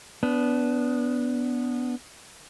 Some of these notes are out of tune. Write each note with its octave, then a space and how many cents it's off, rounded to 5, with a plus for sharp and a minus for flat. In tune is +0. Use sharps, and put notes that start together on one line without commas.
B3 +0 D4 -20